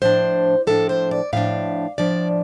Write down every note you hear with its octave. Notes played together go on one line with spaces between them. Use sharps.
A2 F3 D4 C5
A2 F3 D4 A4
C5
D5
A2 F3 D4 F5
A2 F3 D4 D5